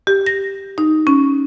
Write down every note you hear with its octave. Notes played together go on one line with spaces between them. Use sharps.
G4
A#6
D#4
C#4